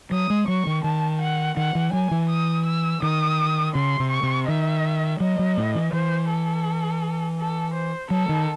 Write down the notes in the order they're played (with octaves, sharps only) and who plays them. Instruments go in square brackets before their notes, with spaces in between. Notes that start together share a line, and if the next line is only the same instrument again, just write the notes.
[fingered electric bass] F#3 [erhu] D#6
[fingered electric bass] G#3
[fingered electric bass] F#3 [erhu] C#6
[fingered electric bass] D#3
[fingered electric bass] D#3 [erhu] A5
[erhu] F#5
[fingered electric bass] D#3 [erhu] F#5
[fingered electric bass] E3
[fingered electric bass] F#3 [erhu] G#5
[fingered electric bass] E3
[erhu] D#6
E6
[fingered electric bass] D#3 [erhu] D#6
[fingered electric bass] C#3 [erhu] C6
[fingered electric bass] C3
[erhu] C#6
[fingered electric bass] C3
[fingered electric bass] D#3 [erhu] E5
[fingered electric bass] F#3 [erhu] D#5
[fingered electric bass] F#3
A2
E3
[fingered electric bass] E3 [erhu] C5
[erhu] A4
A4
C5
[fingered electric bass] F#3 [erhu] A4
[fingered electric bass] D#3